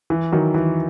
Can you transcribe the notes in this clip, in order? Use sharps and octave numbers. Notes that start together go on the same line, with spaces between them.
E3
D#3 F#3
E3